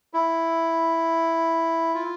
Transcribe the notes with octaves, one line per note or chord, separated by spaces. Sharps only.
E4
F4